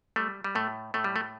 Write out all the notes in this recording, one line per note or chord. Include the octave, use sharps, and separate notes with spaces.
G3 A3
G3
A2 A3
A2 A3
G3
A3